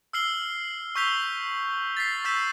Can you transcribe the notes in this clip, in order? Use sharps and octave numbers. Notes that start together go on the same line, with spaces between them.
E6 F6 C7 F#7 G7
C#6 E6 G6 B6 F7 G7
A6 B6 C7
C#6 E6 G6 A6 B6 E7